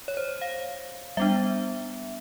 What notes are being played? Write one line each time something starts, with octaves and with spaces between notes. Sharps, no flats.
C#5
C5
F5
G3 B3 D4 E5